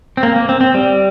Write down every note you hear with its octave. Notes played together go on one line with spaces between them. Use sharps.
C4
A#3
A#3
C4
C4
G3